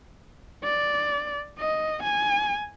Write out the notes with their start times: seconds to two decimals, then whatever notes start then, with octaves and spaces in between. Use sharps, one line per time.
0.64 D5
1.59 D#5
2.03 G#5